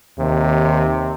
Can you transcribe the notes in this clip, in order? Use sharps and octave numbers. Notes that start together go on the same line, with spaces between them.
D#2 C3